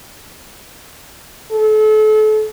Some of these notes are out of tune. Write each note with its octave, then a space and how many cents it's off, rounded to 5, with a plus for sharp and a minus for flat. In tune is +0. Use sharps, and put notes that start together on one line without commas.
A4 -35